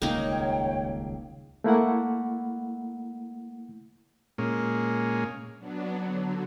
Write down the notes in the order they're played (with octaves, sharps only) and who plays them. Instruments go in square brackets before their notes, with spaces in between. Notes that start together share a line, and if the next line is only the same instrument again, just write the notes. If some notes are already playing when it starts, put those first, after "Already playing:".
[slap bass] D#1 C#2 C#3 [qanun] A#3 D#4 [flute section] C#5 G5
[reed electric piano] A3 A#3 E4 F#5
[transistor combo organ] A#2 G#3 A#3 C#4
[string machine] F#3 B3 D4
D3 F#3